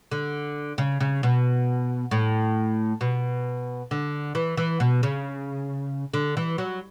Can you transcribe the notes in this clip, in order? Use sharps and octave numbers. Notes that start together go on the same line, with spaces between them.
D3
C#3
C#3
B2
A2
B2
D3
E3
E3
B2
C#3
D3
E3
F#3